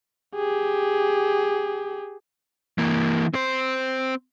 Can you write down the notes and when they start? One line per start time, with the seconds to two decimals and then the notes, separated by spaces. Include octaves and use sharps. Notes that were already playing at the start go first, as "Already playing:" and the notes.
0.35 G4 G#4
2.78 E3 A#3
3.34 C4 C5